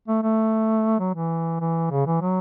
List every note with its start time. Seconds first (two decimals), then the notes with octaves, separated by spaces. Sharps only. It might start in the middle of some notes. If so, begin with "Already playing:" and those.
0.08 A3
0.23 A3
0.99 F#3
1.14 E3
1.60 E3
1.91 C#3
2.06 E3
2.21 F#3